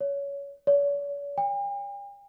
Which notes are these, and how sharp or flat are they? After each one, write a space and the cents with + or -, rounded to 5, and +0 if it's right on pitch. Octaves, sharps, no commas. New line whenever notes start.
C#5 +20
C#5 +45
G5 +45